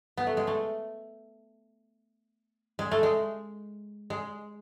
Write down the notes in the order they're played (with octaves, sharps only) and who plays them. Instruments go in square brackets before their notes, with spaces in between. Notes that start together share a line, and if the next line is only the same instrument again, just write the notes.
[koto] B3
A3
G#3
A3
G#3
A3
G#3
G#3